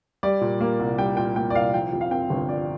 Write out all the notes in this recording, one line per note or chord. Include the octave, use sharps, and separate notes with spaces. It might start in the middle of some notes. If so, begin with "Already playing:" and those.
G3 D5
A#2
A#3
C2
G3 G5
A#2 G5
A#3 G5
D5
C2 F5
F3 G5
F2
F5
C4 G5
G1
F3 D5